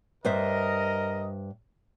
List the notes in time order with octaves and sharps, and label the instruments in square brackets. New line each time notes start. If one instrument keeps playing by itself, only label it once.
[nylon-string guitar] G2 C5 E5 [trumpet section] A#4 D#5